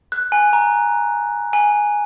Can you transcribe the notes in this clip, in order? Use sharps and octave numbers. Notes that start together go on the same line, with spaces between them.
F#6
G#5
A#5
G#5